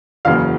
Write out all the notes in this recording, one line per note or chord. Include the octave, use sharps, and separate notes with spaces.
F#1 E2 C#3 F#3 A#3 F5 F6